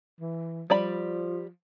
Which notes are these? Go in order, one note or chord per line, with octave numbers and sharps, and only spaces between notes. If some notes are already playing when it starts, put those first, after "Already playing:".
E3
F3 G3 D5 B5